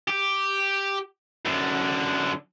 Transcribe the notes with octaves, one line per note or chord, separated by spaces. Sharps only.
G4
F#2 D3